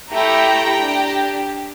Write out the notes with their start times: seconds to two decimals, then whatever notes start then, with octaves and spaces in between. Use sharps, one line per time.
0.12 A3 E4 G4 G5 A#5
0.82 D4 G4